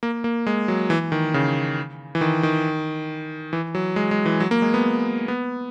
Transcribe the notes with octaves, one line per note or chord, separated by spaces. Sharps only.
A#3
A#3
G#3
F#3
E3
D#3
C#3
E3
D#3
D#3
E3
F#3
G#3
G#3
E3
F#3
A#3
G#3
B3
B3